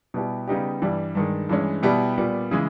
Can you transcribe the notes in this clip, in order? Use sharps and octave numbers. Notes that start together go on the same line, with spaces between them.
B2 G3 B3 E4 G4
C#3 G3 B3 D#4 G4
G2 E3 G3
G2 D#3 G#3
G2 E3 G#3 C#4
B2 G3 B3 E4 G4
A#2 G3 B3
C#3 E3 G#3